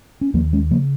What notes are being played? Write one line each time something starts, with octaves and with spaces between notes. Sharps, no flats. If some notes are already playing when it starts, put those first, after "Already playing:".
C#4
D#2 F3 A#3
G#3 C#4
C#3 F3 A#3